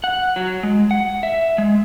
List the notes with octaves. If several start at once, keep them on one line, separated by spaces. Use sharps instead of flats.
F#5
F#3
G#3
F#5
E5
G#3